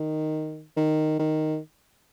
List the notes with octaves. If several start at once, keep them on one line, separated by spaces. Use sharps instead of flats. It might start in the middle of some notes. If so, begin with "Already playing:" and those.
Already playing: D#3
D#3
D#3